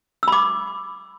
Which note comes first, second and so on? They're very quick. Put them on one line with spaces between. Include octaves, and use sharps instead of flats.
E6 B5 D6